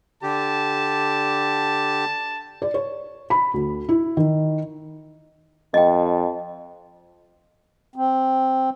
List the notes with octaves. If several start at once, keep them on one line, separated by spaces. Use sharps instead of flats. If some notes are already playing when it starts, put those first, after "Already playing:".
D3 G4 A5
D5
C#5
B5
D2
E4
D#3
F2 D#5 G5
C4